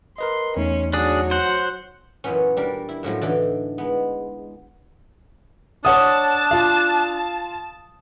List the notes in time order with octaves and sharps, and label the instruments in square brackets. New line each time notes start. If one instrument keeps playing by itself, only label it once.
[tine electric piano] A#4 B4 D#5 [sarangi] C6
[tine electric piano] E2 A3 D#4 [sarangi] C#4
[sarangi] F#3 [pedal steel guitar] D4 G#4
[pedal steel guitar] C5 F#5
[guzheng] F#2 A#2 E3 B3 C#4
G3 D4 A#4
E4
F#2 A2 F3 F#3
D3 E3 D4 D#4
G#3 B3
[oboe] D4 [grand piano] C#5 F#5 D#6 [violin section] A5
[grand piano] F4 F5